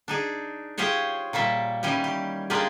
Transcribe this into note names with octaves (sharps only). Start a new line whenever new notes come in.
D4 D#4 G#4
F4 G4 G#4 C5 C#5
A#2 G3 A#3 E5
D#3 E3 G3 C#4 G4
G4
G#3 A#3 D4 F4 G4 G#4